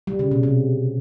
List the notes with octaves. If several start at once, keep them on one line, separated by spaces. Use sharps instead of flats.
G3
C#3
B2
C3